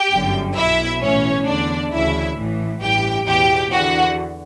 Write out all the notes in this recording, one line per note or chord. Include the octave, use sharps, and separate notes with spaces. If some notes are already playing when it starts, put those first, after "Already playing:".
Already playing: G4 G5
G1 F#2 D3
B1 B2 E4 E5
B1 A2 E3 C#4 C#5
E2 D3 D4 D5
D2 C#3 E3 E4 E5
A1 A2 E3
A1 G2 E3 G4 G5
E2 B2 G4 G5
E2 D3 F#4 F#5